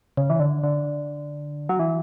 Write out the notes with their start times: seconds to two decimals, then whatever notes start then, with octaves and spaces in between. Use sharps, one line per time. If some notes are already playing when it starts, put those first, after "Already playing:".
0.17 C#3
0.30 E3
0.40 D3
0.64 D3
1.69 F#3
1.79 E3